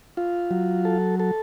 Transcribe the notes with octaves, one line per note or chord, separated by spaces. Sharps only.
F4
F#3
A4
A4